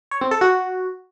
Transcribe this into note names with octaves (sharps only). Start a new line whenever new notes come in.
C#5
C4
A4
F#4